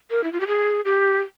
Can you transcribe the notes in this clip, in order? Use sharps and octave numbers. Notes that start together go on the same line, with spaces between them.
A#4
E4
F4
G4
G#4
G4